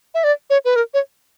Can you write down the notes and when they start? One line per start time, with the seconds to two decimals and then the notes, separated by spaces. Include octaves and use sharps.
0.14 E5
0.24 D5
0.50 C#5
0.65 B4
0.76 A#4
0.94 C#5